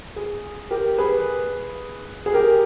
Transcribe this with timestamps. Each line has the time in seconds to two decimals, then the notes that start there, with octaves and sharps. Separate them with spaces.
0.16 G#4
0.71 G4 A#4
0.98 G#4 B4
2.26 G#4
2.34 G4 A#4